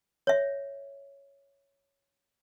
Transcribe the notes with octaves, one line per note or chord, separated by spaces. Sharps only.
C#5 E5